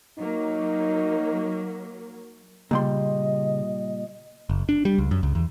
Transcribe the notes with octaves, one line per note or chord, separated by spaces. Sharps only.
F#3 A#3 D#4
A#2 C#3 G3 D#5 C6
F#1
D4
G3
C#2
F#2
C#2
E2